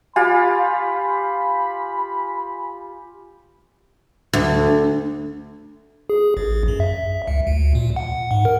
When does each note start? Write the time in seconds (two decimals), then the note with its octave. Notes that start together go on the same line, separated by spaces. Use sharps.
0.16 F4 G4 G#5 B5
4.33 D2
6.10 G#4
6.37 A1
6.68 F#2
6.80 E5
7.27 C#2
7.47 D2
7.75 A#2
7.96 F#5
8.31 G#2
8.45 A#4